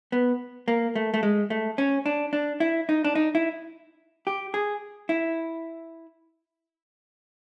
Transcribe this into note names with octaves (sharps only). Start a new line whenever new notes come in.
B3
A#3
A3
A3
G#3
A3
C#4
D4
D4
E4
D#4
D4
D#4
E4
G4
G#4
E4